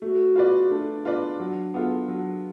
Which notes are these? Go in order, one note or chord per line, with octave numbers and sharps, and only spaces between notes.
A3 F#4
F4 B4 D5
A3 D4
F4 B4 D5
F#3
B3 F4 A4
F#3